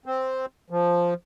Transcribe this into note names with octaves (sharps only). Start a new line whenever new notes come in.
C4
F3